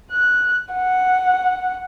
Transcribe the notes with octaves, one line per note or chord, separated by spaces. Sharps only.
F#6
F#5